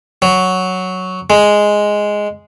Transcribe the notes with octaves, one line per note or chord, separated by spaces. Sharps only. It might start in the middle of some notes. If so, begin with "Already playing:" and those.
F#3
G#3